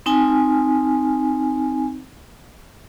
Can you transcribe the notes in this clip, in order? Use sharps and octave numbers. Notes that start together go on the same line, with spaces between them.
C4 D#4 G#5